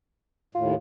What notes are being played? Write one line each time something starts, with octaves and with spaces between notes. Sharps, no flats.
D#2 A2 F4